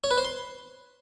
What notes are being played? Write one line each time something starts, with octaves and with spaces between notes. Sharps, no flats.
C#5
B4
C5
C6